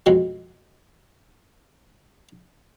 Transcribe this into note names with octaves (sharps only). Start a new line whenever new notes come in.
F2 B2 F#3 G#3